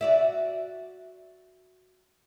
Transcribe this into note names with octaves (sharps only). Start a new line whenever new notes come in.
F#4 D5 E5